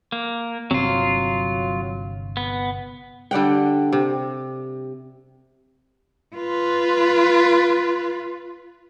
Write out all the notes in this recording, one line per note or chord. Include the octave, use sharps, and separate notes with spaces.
A#3
G1 C3 F#3 C4 F4
B3
D3 G3 F#5 G5
C3
F4 B4